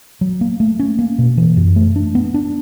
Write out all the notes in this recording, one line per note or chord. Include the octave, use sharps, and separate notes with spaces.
F#3
A#3
A3
C#4
A#3
B2
E3
F#2
A3
D4
B3
D4